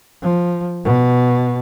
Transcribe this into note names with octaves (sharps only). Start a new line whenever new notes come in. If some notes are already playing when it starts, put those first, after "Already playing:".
F3
B2